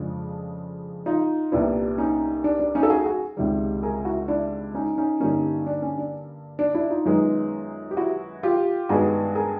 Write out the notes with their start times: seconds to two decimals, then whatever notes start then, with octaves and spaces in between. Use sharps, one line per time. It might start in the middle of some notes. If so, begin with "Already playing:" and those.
Already playing: F2 C#3 F3 G#3 D4
1.06 D#4 F4
1.52 C2 A#2 G3 B3 D4 E4
1.98 C#4 D#4
2.44 D4
2.60 D4
2.75 C#4 D#4
2.83 A4
2.90 F#4 G#4
3.06 F#4 G#4
3.37 C#2 C3 D#3 G3
3.83 G#4 A#4
4.05 E4 F#4
4.28 D4 E4
4.74 C#4 D#4
4.98 C#4 D#4
5.20 G2 D3 G3 A#3 C#4 D#4
5.67 D4
5.82 C#4
5.98 D4
6.59 D4
6.74 D4 E4
6.90 D#4 F4
7.05 F#2 D#3 G#3 B3
7.91 G4
7.97 E4 F#4
8.43 F4 G4
8.89 G2 D#3 G#3 B3 F#4 G#4
9.35 G#4 A#4